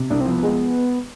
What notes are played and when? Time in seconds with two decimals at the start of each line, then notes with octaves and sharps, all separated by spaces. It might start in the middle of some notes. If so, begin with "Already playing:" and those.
Already playing: C3
0.10 C2 D4
0.21 C4
0.26 F3
0.31 B3
0.43 G#3